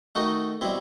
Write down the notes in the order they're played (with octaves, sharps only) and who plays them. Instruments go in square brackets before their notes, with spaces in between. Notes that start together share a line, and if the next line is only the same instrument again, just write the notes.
[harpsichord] D#3 A3 D#4 F#4
B2 G3 C4 E4